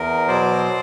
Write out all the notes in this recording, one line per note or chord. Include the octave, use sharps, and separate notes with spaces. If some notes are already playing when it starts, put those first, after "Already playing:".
Already playing: E2 A#4
B2 F#3 C5 D5